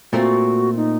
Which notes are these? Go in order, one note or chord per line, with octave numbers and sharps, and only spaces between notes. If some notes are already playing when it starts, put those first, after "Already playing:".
A#2 A3 C4 F#4
D#4